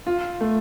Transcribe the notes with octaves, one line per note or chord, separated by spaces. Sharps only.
F4
A3